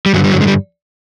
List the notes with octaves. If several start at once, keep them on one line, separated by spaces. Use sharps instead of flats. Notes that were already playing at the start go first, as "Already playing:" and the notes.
G3
G2 D3 F#3
G3
F#3
G#3
G3